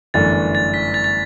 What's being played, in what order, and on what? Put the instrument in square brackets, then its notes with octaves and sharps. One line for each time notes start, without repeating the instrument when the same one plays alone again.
[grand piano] G1 F#2 E3 A3 D4 [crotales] A6
[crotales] A6
B6
A6
A6